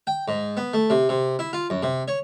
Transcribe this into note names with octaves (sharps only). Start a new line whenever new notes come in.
G5
G#2
B3
A3
C3
C3
E4
F4
F#2
C3
C#5